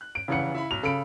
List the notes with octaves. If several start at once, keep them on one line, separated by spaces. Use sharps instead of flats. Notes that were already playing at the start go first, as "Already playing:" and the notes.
F#6
D7
F1 C#3 E3 F#5 C#7
E4 B5
B1 F7
C#3 A4 B5 D7